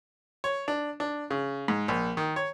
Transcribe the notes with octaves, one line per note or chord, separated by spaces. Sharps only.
C#5
D4
D4
C#3
G#2
A#1
D#3
C#5